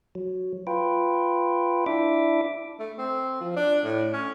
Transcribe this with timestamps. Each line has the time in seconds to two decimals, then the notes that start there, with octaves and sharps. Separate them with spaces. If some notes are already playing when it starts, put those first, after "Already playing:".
0.15 F#3
0.67 F4 B4 G5
1.86 D4 E4 E5 D6
2.79 A3
2.98 C4
3.41 F3
3.56 D4
3.84 A2
4.13 C#4